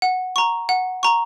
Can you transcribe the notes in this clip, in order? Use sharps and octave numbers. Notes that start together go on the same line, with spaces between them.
F#5
A#5 C#6
F#5
A#5 C#6